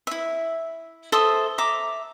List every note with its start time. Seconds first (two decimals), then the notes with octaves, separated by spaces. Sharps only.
0.07 E4 E5
1.12 A4 C5 E5 D#6
1.58 E5 A#5 D6